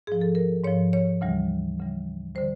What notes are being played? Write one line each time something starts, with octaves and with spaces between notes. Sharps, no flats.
G#2 F3 G#4
A4
A#4
G#2 F3 C#5
C#5
D2 C#3 E3 G3
D2 C#3 E3 G3
D3 G3 C5